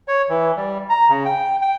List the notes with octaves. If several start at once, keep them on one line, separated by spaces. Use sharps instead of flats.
C#5
E3
G3
A#5
C#3
G5
G5